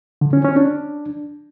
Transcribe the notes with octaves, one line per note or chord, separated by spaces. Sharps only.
D3
C#4
C#4
D4